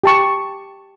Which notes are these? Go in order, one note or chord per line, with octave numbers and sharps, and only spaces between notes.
G4 A5 C#6